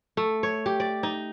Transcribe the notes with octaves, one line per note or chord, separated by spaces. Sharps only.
A3
C#5
G4
D5
D#4